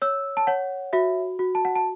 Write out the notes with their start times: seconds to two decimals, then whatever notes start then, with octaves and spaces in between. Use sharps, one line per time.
0.02 C#5 E6
0.37 A5
0.47 C#5 F#5
0.93 F#4 E5
1.39 F#4
1.55 A5
1.65 F#5
1.75 A5